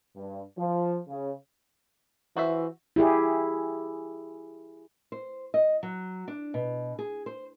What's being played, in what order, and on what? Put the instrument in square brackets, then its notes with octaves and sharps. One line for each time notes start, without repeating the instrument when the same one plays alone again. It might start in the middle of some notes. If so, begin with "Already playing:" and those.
[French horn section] G2
F3
C#3
[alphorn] E3 [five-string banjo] F#4 C5 E5
[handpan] E4 G4 G#4
[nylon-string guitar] C5
D#5
F#3
D4
B2
G#4
C5